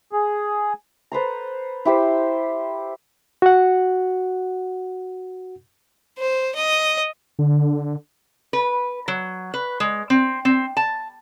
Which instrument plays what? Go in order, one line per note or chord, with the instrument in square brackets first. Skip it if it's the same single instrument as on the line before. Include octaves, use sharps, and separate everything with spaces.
[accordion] G#4
[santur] A4 B4 C5 A#5
E4 G4 C5
[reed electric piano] F#4 F#5
[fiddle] C5
D#5
[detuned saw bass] D3
[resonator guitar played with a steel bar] B4
F#3
B4
G#3
C4
C4
A5